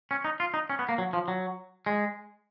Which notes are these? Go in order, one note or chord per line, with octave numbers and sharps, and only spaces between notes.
C#4
D#4
F4
D#4
C#4
B3
A#3
F#3
F3
F#3
G#3